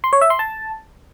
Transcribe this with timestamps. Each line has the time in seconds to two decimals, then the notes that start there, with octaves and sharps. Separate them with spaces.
0.04 C6
0.13 C#5
0.21 E5
0.30 C6
0.39 A5